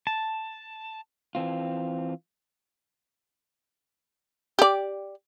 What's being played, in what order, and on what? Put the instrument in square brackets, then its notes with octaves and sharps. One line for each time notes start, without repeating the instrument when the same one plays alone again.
[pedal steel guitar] A5
[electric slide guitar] E3 C4 F4
[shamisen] G4 D5